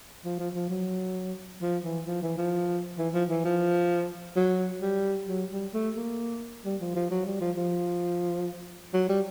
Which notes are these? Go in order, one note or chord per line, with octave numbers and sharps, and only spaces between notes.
F3
F3
F3
F#3
F3
E3
F3
E3
F3
E3
F3
E3
F3
F#3
G3
F#3
G3
A3
A#3
G3
F3
F3
F#3
G3
F3
F3
F#3
G3